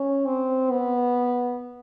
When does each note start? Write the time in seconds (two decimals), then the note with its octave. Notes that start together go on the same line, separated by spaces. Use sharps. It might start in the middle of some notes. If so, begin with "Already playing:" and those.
Already playing: C#4
0.27 C4
0.71 B3